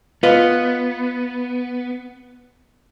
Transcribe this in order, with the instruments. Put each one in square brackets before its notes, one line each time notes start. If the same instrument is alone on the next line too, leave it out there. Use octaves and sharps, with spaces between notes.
[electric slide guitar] B3 [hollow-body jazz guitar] F4 B4 D#5